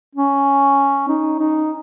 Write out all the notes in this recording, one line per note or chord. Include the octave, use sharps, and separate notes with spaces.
C#4
D#4
D#4